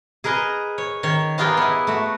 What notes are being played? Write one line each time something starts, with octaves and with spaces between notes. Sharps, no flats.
G#4 A#4 B4 D#5
C#5
D#3 C#5
B3 D#4 F4 G4 G#4 A#4
B3 E4
A3 F#4